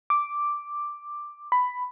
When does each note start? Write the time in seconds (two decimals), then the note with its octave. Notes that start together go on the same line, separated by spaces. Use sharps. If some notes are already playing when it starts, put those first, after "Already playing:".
0.10 D6
1.52 B5